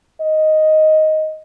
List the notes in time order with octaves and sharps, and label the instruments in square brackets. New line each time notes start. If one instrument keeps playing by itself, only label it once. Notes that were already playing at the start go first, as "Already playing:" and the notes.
[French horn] D#5